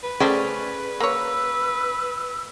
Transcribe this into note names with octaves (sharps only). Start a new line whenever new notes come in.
B4
A3 C#4 G#4 C5 D5 G5
A#3 C#5 E6